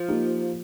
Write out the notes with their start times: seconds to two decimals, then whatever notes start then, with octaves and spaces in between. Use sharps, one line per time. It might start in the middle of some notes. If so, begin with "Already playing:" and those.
Already playing: F3
0.08 A#3 D#4 G4